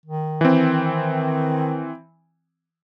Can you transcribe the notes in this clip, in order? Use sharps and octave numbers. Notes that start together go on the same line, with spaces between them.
D#3
E3 C4